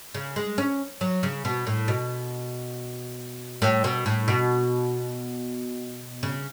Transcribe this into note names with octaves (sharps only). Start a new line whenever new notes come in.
C#3
G#3
C#4
F#3
C#3
B2
A2
B2
A2
B2
A2
B2
C#3